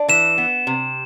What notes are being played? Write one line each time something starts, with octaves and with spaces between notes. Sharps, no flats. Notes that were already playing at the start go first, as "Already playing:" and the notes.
Already playing: D4
E3 E7
B3
C3